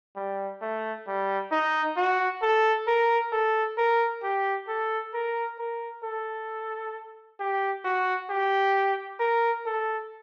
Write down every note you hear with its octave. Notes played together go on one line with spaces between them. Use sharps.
G3
A3
G3
D#4
F#4
A4
A#4
A4
A#4
G4
A4
A#4
A#4
A4
G4
F#4
G4
A#4
A4